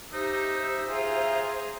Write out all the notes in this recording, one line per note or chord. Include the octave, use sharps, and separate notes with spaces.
D#4 G4 C5 E5
F4 G#4 E5 A#5